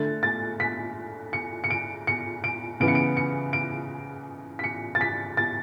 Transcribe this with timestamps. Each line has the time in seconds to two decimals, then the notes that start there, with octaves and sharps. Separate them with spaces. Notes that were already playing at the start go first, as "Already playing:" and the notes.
Already playing: D3 A3 A6
0.23 A6
0.60 B6
1.33 C#7
1.64 C#7
1.70 D7
2.07 C#7
2.44 D7
2.80 C#3 E3 B3 D7
2.88 C#7
2.95 D7
3.17 C#7
3.53 D7
4.59 B6
4.64 C#7
4.95 A6
5.01 B6
5.37 A6